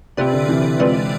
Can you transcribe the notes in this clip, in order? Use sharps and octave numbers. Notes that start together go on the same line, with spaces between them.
C3 C4 F4 B4 D5
D3
C3 E3
G#3 C4 F4 B4 D5